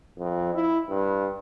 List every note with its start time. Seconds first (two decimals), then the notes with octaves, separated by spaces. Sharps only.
0.18 F2
0.54 E4
0.89 G2